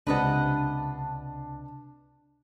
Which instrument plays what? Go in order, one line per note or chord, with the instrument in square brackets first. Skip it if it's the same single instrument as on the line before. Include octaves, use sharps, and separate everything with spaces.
[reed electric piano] C#2 C3 A5 [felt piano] D4 [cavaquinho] B4 D#5 F#5